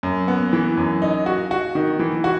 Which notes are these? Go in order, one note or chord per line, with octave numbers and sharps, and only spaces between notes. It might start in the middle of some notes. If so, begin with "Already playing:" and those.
F#2
B3
E3
F#2
D#4
F#4
F#4
D#3
E3
F#4